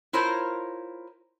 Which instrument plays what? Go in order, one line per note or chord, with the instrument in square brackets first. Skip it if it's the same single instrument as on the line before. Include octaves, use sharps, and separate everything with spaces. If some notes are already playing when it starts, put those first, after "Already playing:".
[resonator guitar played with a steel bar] E4 F4 A#4 C5 C#5